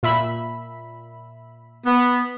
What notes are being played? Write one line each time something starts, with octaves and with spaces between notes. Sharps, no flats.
A#2 E5 B5
B3